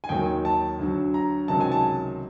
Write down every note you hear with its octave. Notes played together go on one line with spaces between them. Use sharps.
G#5
D#2 D#3 F#3 G5
A5
D2 D3 F#3
A#5
C#2 C3 D#3 F#3 A5
G#5
A5